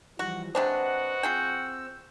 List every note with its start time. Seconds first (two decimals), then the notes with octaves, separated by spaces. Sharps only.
0.19 E3 F3 G3 F#4
0.55 C3 G#3 D4 F#4 B4 C5 D#5 F#5
1.23 C4 F4 G#4 G5 E6 G6